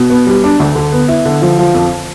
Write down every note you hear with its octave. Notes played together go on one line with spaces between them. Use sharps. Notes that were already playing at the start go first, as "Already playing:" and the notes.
Already playing: B2
B3
G3
D4
D2
D3
B3
E4
D3
F3
F3
F2